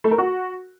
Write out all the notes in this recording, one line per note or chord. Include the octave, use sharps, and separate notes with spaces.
A3
A#4
F#4